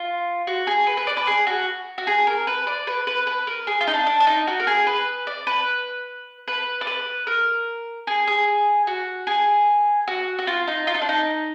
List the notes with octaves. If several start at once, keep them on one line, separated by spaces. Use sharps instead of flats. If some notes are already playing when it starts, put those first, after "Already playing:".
Already playing: F4
F#4
G#4
B4
B4
D5
B4
G#4
F#4
F#4
G#4
A#4
B4
D5
B4
B4
B4
A#4
G#4
F4
D#4
D4
D4
D4
D#4
F#4
A#4
G#4
B4
D5
B4
B4
D5
B4
A#4
G#4
G#4
F#4
G#4
F#4
F#4
F4
D#4
F4
D#4
D4
D#4